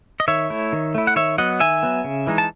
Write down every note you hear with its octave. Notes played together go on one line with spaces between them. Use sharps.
D#5
D#3 C#5 E5
A3 E4
D#3
A3 E4
F#5
D#3 C#5 E5
F#3 B3 D#5 F#5
D#3 E5 G#5
F#3 B3
C#3
E3 G#3 D#4
A5